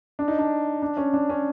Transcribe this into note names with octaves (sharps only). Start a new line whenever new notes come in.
D4
D#4
D4
D4
C#4
D4
C#4